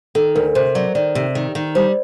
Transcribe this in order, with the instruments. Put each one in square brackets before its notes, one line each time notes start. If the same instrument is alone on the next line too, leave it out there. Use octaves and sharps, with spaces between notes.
[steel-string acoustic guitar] D#3 [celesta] A4
[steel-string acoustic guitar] D2 [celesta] A#4
[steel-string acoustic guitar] C3 [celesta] C5
[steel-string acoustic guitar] F#3 [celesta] D5
[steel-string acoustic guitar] D#3 [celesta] D5
[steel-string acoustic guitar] C3
D#3
D#3
[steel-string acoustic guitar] G3 [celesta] C5